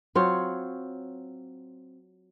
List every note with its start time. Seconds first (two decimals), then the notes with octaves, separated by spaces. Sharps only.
0.15 F#3 C4 F4 C#5